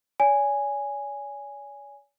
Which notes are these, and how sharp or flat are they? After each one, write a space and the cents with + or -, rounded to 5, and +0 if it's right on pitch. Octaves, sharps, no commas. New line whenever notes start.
C#5 +45 G#5 -5